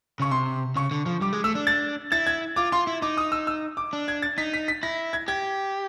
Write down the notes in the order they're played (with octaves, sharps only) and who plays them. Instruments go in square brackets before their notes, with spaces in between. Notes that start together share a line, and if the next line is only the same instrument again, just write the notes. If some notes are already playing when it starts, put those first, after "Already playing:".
[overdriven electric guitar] C#3 [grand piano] C#6
[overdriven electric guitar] C3 [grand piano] C6
[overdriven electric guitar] C#3 [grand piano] C#6
[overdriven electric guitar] D3
F3
[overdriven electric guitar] G3 [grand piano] D6
[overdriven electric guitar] G#3
[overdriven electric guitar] A3 [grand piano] E6
[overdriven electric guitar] D4
[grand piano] A6
[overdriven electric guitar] E4 [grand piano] A6
[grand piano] G#6
[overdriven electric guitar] F4 [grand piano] D6
[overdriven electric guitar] F4 [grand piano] C6
[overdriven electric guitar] E4
[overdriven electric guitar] D#4 [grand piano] D6
[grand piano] D#6
E6
E6
D6
[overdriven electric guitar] D4
[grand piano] G#6
A6
[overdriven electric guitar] D#4 [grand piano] B6
[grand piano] B6
B6
[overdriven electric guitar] E4 [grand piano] A#6
[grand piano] G#6
[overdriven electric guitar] G4 [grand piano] G#6